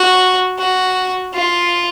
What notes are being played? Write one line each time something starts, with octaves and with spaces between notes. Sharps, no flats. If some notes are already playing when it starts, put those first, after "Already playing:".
Already playing: F#4
F#4
F4